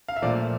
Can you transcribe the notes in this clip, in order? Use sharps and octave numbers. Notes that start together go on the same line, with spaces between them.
F5
E5
A#2 F3 A3 D5